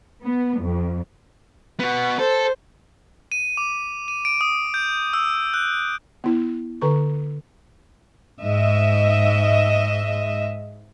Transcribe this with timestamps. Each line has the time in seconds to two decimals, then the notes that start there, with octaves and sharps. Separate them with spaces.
0.23 B3
0.62 F2
1.80 B3 F#4
2.19 A4 C5
3.32 D#7
3.57 D6
4.08 D#7
4.25 D7
4.41 D#6
4.74 G6
5.13 E6
5.54 F#6
6.24 B3 E4
6.81 D3 B4 C#6
8.41 G#2 D#5 E5